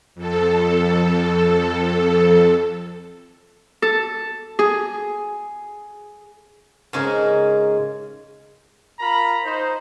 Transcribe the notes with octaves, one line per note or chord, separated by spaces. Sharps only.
F2 A4
A4
G#4
G#2 C#3 G#3 A#4
F4 A#4 A#5 B5
D#4 C5